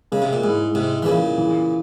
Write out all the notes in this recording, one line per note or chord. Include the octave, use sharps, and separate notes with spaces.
C#3 G#3
C3
A#2
G#2 E4 G#4
G#2 C3 G#3
E3
A#2 C#3 E4 G#4
E3